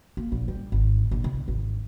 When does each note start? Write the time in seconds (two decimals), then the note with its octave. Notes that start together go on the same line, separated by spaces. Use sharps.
0.17 A#3
0.32 A#1
0.48 G3
0.72 G#1
1.11 A#1
1.24 C2
1.48 G#1